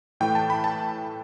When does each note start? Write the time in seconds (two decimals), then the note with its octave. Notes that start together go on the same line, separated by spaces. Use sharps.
0.20 A2 E3 A3 G5
0.35 A5
0.50 B5
0.64 A5